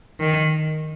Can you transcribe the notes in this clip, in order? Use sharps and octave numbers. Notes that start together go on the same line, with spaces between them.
D#3